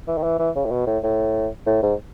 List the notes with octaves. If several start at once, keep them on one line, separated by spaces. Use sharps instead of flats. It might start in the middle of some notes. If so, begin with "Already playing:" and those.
E3
D#3
E3
E3
C#3
A2
B2
A2
A2
A2
G#2